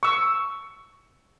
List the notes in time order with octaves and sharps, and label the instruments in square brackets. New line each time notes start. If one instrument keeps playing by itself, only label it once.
[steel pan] C#6 E6